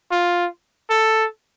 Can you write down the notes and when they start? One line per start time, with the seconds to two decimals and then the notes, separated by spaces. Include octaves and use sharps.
0.12 F4
0.91 A4